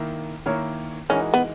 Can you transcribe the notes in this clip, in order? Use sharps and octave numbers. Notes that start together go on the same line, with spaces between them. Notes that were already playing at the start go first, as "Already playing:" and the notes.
Already playing: D#3 A#3 E4 A#4
D#3 A#3 E4 A#4 C#5
E3 G#3 C#4 D#4 F#4 A#4
B3